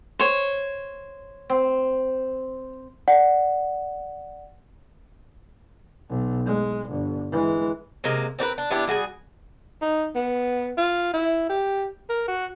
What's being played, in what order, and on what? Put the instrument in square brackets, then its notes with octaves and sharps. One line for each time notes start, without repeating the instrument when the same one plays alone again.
[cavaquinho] C5 C#5
[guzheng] C4
[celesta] D5 F#5
[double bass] B1
G#3
G1
E3 G#3
[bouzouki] C3 G#3 A#3
C4 D4 A#4 B4
D4
B3 D4 E4 G4
G3 F#4 G#4 G#5
[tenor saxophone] D#4
B3
F4
E4
G4
A#4
F#4